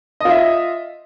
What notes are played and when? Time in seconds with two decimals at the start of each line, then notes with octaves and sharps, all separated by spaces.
0.20 D#5
0.25 F4
0.30 E5